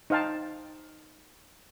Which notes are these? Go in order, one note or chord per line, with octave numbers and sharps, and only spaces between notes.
D#4 C5 F5 G5 A5